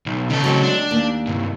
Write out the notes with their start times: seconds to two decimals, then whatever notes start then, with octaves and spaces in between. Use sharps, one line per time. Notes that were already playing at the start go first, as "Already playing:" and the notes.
0.06 B1
0.30 C#3 A4
0.44 F#3 G#3 C4
0.63 D4
0.91 D#2
1.27 C2 G2